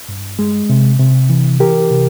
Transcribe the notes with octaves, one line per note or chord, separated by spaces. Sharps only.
G2
G#3
C3
C3
E3
E3 G4 A#4
C3